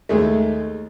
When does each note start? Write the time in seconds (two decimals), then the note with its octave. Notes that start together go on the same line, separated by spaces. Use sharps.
0.09 D#2 G#3 A3